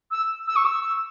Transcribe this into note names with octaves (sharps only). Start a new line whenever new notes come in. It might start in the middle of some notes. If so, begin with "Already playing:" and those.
E6
E6
C#6
E6